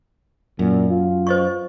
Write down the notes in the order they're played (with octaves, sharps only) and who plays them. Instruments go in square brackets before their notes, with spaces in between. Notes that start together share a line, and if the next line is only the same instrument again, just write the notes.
[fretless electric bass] F#2 [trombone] A#2
[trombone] F4
[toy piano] C5 D#5 C#6